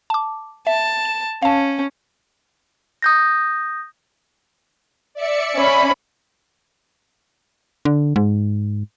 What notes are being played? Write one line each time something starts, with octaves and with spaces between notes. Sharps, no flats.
A5 D6
E5 A5
E7
C#4 F5 A5
D#6 G6 A#6
D5 E5 C#7
C#4 B5
D3
G#2